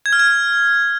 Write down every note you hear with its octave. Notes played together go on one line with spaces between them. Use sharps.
G#6
F6
G#6